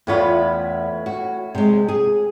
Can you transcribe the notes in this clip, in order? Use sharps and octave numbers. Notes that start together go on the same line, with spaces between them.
E2 A2 B3 C#4 F4 B5
F#4
C3 G#3
G#4